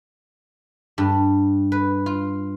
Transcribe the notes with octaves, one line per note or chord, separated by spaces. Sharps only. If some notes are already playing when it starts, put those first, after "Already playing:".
G2
B4
F4